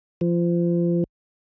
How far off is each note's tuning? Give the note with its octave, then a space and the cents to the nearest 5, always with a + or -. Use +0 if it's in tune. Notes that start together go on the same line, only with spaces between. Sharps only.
F3 -25